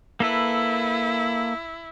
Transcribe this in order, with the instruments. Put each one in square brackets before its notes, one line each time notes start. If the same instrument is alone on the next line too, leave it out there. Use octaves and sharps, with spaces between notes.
[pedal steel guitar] A#3 A4 B4 [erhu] E4